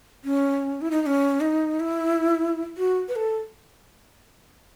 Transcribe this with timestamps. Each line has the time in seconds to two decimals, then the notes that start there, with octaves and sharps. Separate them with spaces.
0.25 C#4
0.81 E4
0.91 D#4
1.02 D#4
1.06 C#4
1.41 D#4
1.80 E4
2.77 F#4
3.09 B4
3.16 A4